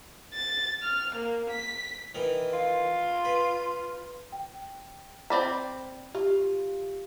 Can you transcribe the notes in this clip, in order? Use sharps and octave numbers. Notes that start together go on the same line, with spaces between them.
A6
F6
A#3
B6
D#3 E3
F4
B4
G5
C4 D5 B5
F4 G4